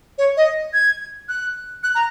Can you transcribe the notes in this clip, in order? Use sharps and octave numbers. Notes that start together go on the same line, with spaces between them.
C#5
D#5
G#6
F#6
F#6
A#5